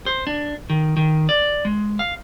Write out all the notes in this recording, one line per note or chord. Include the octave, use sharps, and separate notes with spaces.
C5
D4
D#3
D#3
D5
G#3
F5